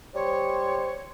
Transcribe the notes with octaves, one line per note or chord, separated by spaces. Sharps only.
G3 C5 C#5